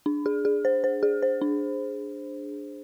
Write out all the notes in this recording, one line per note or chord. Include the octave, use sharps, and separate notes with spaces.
D4
G#4
G#4
C5
C5
G#4
C5
D4